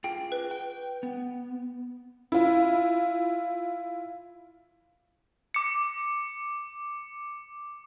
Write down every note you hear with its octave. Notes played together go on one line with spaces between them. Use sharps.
F4 G#4 G5
B4
G5
B3
E4 F4
D6 C#7